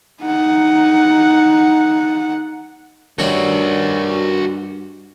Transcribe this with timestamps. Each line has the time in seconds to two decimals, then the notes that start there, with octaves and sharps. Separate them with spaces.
0.22 D#4 F#5
3.19 G2 D#3 C#4 E4 F#4 D5